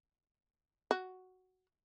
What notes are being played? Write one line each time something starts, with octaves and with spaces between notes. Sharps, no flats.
F#4